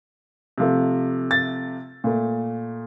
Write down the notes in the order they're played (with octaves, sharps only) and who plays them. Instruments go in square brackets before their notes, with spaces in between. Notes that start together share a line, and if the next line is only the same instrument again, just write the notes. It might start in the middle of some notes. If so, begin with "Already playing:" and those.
[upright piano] C3 F3 A3
A6
A#2 A3